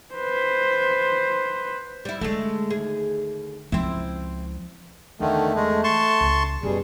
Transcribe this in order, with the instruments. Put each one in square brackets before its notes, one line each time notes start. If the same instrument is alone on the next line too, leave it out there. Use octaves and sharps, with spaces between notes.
[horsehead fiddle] B4 C5
[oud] G3 E4
[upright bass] D3 [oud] G#3 A3
[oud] D#2 G#4
[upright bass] C#2 F3 [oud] C4 E4
[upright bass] E2 [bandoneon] D3 D#3 [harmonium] A3
[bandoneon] G#3
A5 C6 C#6
[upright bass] C#2
[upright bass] F#2 A#3 [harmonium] B2 G3 G#4